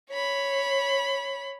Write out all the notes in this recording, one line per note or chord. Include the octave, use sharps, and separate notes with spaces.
C#5 B5